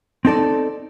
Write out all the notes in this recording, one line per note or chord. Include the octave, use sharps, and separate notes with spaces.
C4 D#4 A4 D5